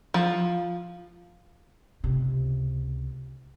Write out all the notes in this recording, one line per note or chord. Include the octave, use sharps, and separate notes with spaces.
F3
C#2 C3